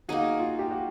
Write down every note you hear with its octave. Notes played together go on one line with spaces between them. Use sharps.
A#3 D#4 F#4 G#4
F4
G4
F#4